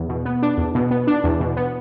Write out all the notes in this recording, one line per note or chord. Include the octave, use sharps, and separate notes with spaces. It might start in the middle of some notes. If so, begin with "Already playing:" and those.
Already playing: E2
B2
B3
D4
E2
B2
B3
D4
E2
B2
B3